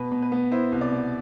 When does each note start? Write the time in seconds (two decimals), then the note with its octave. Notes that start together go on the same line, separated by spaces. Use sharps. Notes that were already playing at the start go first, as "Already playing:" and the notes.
Already playing: B2 B4
0.12 B2
0.22 B4
0.32 B3
0.51 E4 C5
0.72 C2
0.81 D5
0.91 B2